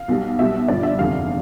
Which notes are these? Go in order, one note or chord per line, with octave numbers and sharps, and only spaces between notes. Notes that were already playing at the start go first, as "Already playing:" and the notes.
Already playing: F5
B1 B2 G3
B1 B2 G3 E5
G1 G2 F3 D5
E5
F1 E2 D3 G3 F5